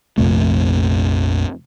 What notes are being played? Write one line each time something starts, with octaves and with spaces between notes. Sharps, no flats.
A#1 F2 C3 A3